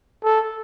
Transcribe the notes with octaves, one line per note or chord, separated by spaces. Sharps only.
A4